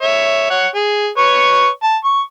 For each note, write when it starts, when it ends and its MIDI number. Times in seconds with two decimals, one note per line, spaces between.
0.02 0.49 73
0.02 0.49 76
0.50 0.67 73
0.50 0.67 78
0.75 1.09 68
1.18 1.68 71
1.18 1.68 73
1.18 1.68 85
1.83 1.96 81
2.04 2.21 85